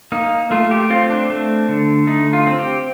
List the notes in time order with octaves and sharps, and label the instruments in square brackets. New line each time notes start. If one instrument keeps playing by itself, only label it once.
[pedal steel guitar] A#3 D#4
A3 F4
G4
C4 F4
D4
A3
D3
A3 D#4
F4
C4
G4